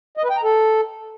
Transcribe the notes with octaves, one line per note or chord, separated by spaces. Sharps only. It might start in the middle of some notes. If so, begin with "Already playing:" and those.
D#5
B4
G5
A#5
A4